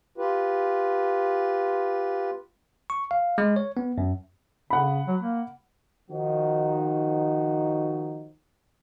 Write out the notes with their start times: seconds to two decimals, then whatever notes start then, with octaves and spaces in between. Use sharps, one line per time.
0.18 F4 G4 B4
2.90 C#6
3.11 F5
3.38 G#3
3.56 C#5
3.77 B3
3.98 F#2
4.70 C#3 F#5 B5
5.07 F#3
5.21 A#3
6.11 D#3 F3 D#4 F#4